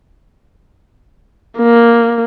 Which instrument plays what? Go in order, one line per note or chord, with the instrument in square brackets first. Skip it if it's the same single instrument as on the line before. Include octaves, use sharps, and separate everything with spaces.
[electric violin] A#3